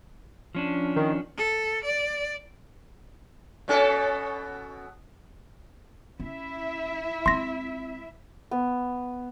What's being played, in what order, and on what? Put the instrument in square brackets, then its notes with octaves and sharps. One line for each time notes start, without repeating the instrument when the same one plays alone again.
[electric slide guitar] F3 C#4 D4
[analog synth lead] D#3
[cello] A4
D5
[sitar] B2 C#4 A4
[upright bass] C#4 [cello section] E4 E5
[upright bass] G#3 C4 [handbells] C6 A#6
[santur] B3